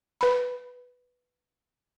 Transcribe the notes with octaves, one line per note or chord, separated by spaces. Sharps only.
B4 B5